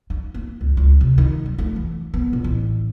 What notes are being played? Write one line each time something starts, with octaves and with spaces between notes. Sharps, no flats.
D#4
A#3
C#2
C#2
C3
D#3
F#3
A3
E3
B3
A#1
A1